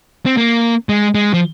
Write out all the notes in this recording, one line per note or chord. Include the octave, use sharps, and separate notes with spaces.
C4
A#3
G#3
G#3
F3